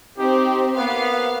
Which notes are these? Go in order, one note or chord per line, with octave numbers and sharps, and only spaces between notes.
C4 D#4 G4
A#3 B3 F5